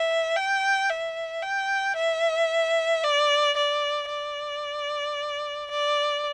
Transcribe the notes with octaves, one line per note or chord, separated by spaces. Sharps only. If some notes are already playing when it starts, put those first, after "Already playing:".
Already playing: E5
G5
E5
G5
E5
D5
D5
D5
D5